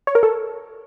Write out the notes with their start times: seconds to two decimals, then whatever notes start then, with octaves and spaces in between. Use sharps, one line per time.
0.07 C#5
0.15 A#4
0.23 A4